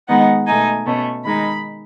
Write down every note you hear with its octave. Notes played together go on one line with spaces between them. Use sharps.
D#3 G#3 B3 D#4 F#5
B2 A3 D#4 G#5
B2 A3 C#4
D#3 G#3 D#4 B5